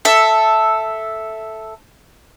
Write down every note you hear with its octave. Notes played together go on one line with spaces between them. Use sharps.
A4 E5